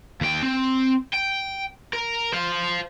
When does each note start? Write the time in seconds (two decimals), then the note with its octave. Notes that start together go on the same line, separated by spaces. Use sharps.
0.21 D#2 G5
0.43 C4
1.13 G5
1.93 A#4
2.33 C5 F5